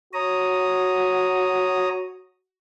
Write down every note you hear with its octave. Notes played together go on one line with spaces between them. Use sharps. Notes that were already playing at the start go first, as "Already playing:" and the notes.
F#4 C#5 A#5 D#6